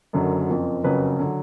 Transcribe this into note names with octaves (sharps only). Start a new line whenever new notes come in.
F#1 F#2 D3 F#3
F#1 F2 F3
F#1 F2 C#3 F#3 B4
D3 F#3